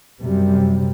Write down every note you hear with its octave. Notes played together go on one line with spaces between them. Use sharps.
F#2 C3 G3